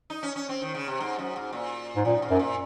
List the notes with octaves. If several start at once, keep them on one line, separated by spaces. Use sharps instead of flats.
D#4
C#4
C#4
C4
D#3
C#3
C3
G#2
F#2
G#2
A#2
G#2
F#2 A#2
G#2
F#2
A#2